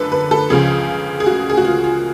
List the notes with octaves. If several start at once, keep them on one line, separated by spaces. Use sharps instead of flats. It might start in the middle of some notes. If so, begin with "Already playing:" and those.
Already playing: F#2 D3 F3 A4 B4
B4
A4
C#2 C#3 F3 G#4
G#4
F#4
G#4
F#4
F4
F4